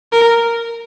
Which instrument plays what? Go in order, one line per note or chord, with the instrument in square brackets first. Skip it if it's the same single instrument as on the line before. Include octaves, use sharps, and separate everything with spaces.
[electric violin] A#4